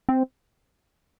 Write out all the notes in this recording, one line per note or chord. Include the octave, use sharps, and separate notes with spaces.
C4